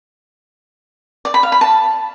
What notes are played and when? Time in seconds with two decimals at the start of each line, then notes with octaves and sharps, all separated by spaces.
1.25 D5
1.34 B5
1.43 F5
1.52 B5
1.61 A5